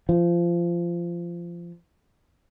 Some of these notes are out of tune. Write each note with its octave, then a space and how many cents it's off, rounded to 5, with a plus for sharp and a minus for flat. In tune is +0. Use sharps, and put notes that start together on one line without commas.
F3 -20